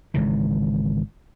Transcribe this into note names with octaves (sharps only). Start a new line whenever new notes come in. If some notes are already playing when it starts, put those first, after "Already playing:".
G#1 G#2 C#3 E3